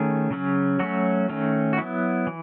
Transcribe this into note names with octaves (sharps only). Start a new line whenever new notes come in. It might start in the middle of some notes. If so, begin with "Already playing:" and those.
Already playing: D#3 A3 C#4 G#4
C#3 F#3 C#4
F#3 A3 C#4 F#4
D#3 A3 C#4
F#4
F#3 B3 E4
E3